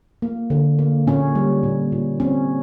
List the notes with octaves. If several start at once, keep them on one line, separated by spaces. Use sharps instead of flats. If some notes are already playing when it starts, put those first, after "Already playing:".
A#3
D3
A#3
A#2 C#4
G3
A#2
A#2
C4 C#4